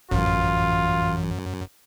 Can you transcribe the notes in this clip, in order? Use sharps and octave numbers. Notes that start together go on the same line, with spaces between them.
A1 F#2 E3 F4